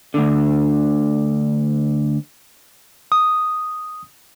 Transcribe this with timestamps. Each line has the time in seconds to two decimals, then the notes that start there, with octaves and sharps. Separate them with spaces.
0.14 D2 D3
3.12 D#6